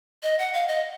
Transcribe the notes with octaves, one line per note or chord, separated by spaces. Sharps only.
D#5
F#5
F5
D#5